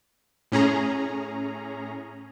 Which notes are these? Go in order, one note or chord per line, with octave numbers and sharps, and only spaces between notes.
A2 C#4 G#4 A#5